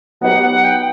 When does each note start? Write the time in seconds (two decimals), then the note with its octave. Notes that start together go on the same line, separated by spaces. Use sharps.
0.21 F#3 B3 D#4 G4 B4 F#5
0.43 F#5
0.64 G5